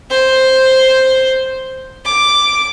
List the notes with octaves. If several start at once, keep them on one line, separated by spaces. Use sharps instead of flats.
C5
D6